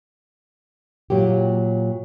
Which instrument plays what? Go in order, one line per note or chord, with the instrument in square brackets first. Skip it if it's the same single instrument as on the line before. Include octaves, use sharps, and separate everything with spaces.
[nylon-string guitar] A#2 F#3 A#3 G4